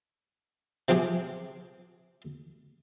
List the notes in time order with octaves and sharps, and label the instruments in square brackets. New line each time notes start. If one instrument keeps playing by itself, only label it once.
[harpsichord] C3 F3 C4 G4 G#4